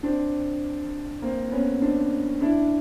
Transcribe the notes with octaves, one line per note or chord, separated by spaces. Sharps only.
C4 D4
A#3 C4
B3 C#4
C4 D4
D4 E4